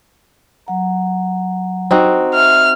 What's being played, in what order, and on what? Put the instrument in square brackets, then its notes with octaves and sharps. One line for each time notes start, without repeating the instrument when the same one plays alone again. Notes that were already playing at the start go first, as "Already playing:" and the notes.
[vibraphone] F#3 F#5 A#5
[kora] C4 D#4 F#4
[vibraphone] E5 [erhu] F6